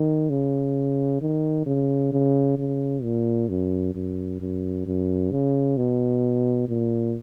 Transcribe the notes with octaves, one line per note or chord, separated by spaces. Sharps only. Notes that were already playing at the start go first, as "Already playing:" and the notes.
Already playing: D#3
C#3
D#3
C#3
C#3
C#3
A#2
F#2
F#2
F#2
F#2
C#3
B2
A#2